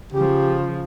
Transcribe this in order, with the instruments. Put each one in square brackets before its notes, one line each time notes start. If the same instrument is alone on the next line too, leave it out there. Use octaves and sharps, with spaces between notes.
[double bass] C#3 F3 [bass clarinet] G4